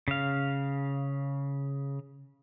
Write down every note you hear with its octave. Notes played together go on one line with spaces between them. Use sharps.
C#3 F5